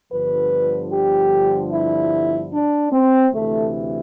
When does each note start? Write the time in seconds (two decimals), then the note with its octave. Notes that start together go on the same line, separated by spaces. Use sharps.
0.12 G1 G2 D3 F3 B4
0.92 G4
1.73 E4
2.53 D4
2.92 C4
3.32 D2 C3 E3 A3